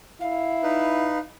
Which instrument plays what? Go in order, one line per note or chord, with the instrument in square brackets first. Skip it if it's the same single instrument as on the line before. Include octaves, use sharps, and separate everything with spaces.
[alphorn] E4 [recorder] F5
[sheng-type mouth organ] D#4 B4